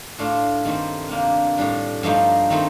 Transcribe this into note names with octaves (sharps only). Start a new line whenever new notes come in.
A2 A3 D4 F4
G2 D#3 A3 C4
C3 D#3 A#3 D4
A2 G3 D4
G2 F3 A3 D#4
D#3 A3 C4 D#4